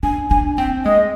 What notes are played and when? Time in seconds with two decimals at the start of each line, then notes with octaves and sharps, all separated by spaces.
0.03 D4 G#5
0.30 D4 G#5
0.58 C4 G5
0.85 G#3 D#5